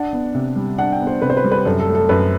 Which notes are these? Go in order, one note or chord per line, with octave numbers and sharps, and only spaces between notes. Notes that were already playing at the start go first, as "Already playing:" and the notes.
Already playing: D4 F#5
B3
C3
G3
D4 F#5
G5
B3
C5
C3 B4
C5
B4
G3
B4
F#2 A4
A4
A3
A4
F#2 B4